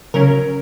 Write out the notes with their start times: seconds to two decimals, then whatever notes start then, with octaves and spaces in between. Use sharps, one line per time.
0.14 C#3 F#3 C#4 A#4